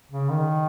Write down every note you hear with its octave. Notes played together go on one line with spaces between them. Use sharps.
C#3
D#3